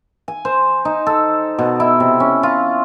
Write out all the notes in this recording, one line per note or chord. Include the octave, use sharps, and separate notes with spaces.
G#5
C5
D#4
A4
B2
E4
C3
C#4
F4